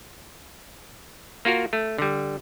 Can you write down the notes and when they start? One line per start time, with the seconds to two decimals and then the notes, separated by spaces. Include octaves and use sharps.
1.45 A#3 F4 F#4 A#4
1.73 A3
1.98 D3 G3